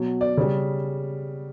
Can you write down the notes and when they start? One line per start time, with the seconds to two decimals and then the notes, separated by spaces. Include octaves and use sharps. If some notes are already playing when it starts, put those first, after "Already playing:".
Already playing: B2 F#3
0.21 D5
0.37 C#3 G3